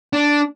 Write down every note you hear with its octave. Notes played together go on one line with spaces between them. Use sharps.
D4